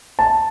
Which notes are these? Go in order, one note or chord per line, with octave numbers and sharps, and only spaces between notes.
A5